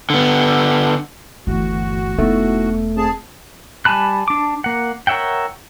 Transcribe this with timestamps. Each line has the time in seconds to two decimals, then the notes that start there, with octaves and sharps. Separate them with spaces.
0.10 D3 B3
1.47 G1 D#2 E3 A3 F#4
2.18 E1 A3 B3 D#4 E4
2.97 C4 G#4 A5
3.85 G3 G#5 A5 B5 F#6
4.28 D4 D6
4.64 A#3 F#5
5.07 A#4 C#5 E5 F#5 G5